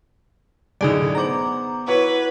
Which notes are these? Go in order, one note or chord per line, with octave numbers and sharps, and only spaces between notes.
F#2 A2 D3 D#4 G#4 D5
B3 C5 A#5 D6 F#7
E4 F#4 B4 C#5